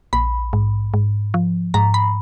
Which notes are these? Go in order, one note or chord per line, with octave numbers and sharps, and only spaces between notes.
A#1 B5
G#2
G#2
F3
G#2 A#5
B5